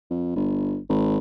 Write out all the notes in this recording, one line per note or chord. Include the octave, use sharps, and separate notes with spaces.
F2
G1
G#1